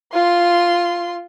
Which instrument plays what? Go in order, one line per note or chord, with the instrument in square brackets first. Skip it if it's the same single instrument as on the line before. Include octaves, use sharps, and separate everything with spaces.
[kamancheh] F4 C6